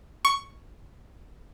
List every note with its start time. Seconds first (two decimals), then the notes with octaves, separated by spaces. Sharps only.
0.25 C#6